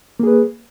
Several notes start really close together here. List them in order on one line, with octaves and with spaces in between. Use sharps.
A#3 G#4 B4